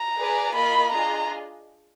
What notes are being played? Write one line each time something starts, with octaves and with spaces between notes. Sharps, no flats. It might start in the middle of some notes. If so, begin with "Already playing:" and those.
Already playing: A#5
G#4 B4 D5 G#5
A#3 F4 A#4 D#5 B5
D4 F4 G#4 D#5 A#5